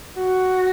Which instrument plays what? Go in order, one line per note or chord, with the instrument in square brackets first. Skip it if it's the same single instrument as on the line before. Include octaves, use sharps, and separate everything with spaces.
[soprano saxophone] F#4